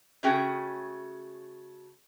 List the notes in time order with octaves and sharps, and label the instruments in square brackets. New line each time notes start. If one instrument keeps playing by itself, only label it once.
[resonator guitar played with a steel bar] C#3 A3 C#4 F#4 G#4 G5